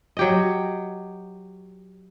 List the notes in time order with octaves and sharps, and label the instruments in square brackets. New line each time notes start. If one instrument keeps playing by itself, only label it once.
[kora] F#3 G4 D#5